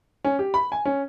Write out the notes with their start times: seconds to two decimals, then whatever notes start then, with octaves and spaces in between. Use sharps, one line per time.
0.24 C#4
0.39 G4
0.54 B5
0.72 G#5
0.85 C#4